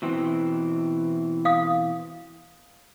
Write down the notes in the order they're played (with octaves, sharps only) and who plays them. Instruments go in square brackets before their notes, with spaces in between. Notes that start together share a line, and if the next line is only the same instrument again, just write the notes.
[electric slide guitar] B2 E3 C4
[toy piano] F5 D#6